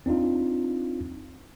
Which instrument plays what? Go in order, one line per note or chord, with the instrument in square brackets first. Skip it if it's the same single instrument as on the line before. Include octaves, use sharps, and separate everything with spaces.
[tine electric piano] C4 D4 D#4 F4